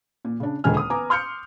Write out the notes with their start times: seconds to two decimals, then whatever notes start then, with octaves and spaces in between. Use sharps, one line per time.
0.25 A#2
0.40 C#3 D4
0.64 D#1 C#2 D3 G#3 G#5 F6
0.77 D#6
0.90 B3 G#5 A#5 D6
1.10 C6 F6 G6 C#7